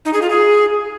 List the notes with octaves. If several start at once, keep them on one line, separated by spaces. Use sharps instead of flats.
D#4
G#4
F4
G#4